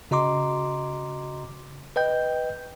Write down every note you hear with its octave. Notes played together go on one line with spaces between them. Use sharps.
C#3 F#4 D#5 A#5 C6 D6
B4 D#5 G5 G6